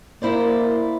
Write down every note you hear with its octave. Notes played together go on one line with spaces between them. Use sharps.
A#3 E4 C5 D5